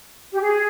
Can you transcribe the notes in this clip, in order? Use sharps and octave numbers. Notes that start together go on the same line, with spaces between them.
G4
G#4